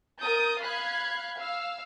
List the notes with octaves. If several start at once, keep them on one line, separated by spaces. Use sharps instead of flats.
A#4 D#6 G6 A6
F5 B5 F#6 G#6
F5 E6